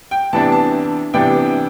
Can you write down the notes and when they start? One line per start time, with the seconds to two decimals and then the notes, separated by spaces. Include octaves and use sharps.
0.11 G5
0.33 C3 E3 B3 D4 A5
0.52 A5
1.14 C3 E3 B3 D4 G5